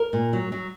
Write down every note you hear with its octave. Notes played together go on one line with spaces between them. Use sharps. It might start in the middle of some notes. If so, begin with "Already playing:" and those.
Already playing: A#4
A#2
F#3
F#3